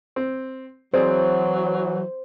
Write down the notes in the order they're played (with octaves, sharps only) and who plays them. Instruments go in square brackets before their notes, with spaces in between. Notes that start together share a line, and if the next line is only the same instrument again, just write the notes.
[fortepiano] C4
[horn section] E3 F#3 [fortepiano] C4 G#4 D5 [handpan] C5